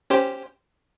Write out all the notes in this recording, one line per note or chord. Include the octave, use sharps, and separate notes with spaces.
C#4 G4 C5